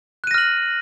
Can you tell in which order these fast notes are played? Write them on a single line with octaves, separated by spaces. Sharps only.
F#6 D#7 A#6 F6 F#7